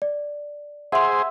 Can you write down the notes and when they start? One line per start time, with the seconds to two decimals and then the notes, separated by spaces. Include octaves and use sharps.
0.02 D5
0.92 G#4 C5 E5 F#5 C6